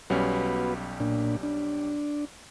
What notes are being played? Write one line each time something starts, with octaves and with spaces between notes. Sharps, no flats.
B1 G3 B3 C#4 F#4 B4
A#2 D4
D4